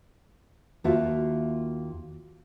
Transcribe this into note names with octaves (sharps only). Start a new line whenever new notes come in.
D#2 A#3 F4 F#4 E5 A5